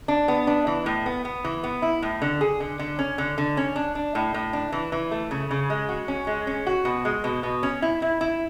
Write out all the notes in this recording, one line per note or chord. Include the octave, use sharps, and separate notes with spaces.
D4
B3
D4
E3
A2
B3
B3
E3
B3
E4
A2
D3
G#4
D3
D3
C#4
D3
D3
C#4
D4
D4
A2
A2
D4
E3
E3
A3
C#3
C#3
G#3
F#4
C#4
G#3
C#4
F#4
B2
G#3
B2
B2
C#4
E4
E4
E4